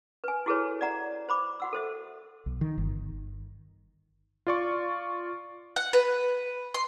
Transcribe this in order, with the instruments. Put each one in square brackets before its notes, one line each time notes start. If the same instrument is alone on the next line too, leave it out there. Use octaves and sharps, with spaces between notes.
[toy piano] B4 G#5
E4 F#4 G#4 A4 B4 C#5
D5 E5 F#5 A#5
C5 B5 D6
F#4 F#5 E6
A4 C5 E5
[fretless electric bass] B1
D#3
G1
[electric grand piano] F4 D5 C#6
[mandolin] F#5
B4
C6